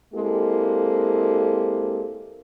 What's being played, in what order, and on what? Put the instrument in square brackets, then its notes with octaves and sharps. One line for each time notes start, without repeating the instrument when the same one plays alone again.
[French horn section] G#3 A#3 C4 E4 G4 A4